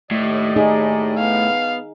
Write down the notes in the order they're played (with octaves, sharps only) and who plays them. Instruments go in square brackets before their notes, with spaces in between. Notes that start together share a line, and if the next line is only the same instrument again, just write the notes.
[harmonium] D#2 D5 D#5 [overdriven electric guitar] A2
[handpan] D#4 G#4
[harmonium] B3 [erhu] F5